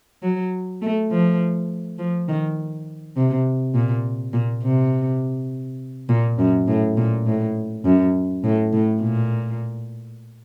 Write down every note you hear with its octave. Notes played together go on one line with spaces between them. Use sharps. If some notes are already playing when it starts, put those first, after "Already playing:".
F#3
A3
F3
F3
D#3
C3
A#2
A#2
C3
A#2
F#2
A2
A#2
A2
F#2
A2
A2
A#2